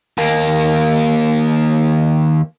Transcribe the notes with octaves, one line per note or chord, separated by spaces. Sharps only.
D#2 A#3